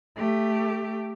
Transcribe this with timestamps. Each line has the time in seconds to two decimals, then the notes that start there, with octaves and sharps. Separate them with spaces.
0.16 A3 G4